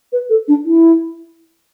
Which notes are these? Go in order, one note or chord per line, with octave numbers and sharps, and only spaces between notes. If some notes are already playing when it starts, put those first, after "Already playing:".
B4
A4
D4
E4